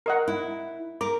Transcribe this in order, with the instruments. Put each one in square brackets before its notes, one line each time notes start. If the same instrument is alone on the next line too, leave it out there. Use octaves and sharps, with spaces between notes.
[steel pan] A#4 D#5 F#5
[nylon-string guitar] E4
[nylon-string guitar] A#4 [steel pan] D6